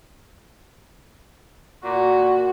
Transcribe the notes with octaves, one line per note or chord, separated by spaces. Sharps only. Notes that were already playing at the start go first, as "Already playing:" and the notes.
A#2 F#4